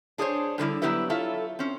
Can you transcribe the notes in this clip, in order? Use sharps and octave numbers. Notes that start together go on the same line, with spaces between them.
D4 G#4 A4 C5 C#5
A2 D3 G3 E4
F#3 B3 E4 G4 B4 E5
E4 F4 A4 C#5 E5
C4 C#4